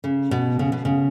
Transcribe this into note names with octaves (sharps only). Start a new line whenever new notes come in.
C#3
B2
C#3
B2
C#3